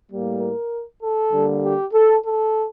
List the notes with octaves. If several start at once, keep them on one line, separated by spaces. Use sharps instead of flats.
A2 G3 A#3
A#4
A4
D3 G3 A#3
G4
A4
A4